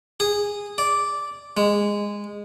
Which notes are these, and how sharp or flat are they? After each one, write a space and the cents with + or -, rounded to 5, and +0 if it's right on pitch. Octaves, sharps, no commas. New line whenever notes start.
G#4 -15
D5 -10
G#3 -15